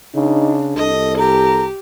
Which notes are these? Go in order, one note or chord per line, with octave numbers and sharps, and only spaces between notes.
C#3 D4 D#4
C2 A4 D#5
G4 A#5